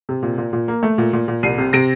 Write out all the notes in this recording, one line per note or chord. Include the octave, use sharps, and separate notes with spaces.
C3
A#2
A#2
A#2
A#3
A3
A#2
A#2
A#2
C2 C7 D#7
C3
C3 A#6 D7